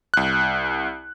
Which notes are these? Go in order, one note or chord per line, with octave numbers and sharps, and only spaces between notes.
C2 F#6